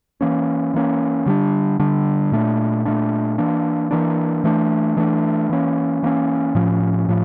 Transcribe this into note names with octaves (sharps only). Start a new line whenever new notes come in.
E3 A#3 C#4
E3 A#3 C#4
D3 G3 D4
D3 G3 D4
A#2 A3 D4
A#2 A3 D4
E3 A#3 D4
E3 A#3 D4
E3 A3 D4
E3 A3 D4
E3 A#3 C#4
E3 A#3 C#4
A2 F3 C#4
A2 F3